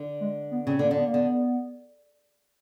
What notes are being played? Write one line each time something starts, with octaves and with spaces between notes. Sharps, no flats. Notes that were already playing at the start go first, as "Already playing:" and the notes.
Already playing: D3
G#3
B3
C#3 C4
D3
A#3
D3
B3
A#3
D3 B3